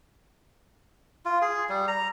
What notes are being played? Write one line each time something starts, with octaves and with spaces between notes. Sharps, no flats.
F4
G#4
G3
A#5